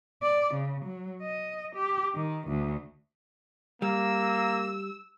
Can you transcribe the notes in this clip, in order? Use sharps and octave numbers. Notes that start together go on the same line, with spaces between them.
D5
C#3
F#3
D#5
G4
D#3
D2
G3 A#3 E6